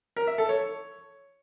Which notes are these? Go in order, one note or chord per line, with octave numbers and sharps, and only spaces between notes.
A#4
E5
A4
C#5